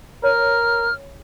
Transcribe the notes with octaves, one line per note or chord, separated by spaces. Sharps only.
A#4 C#5 F6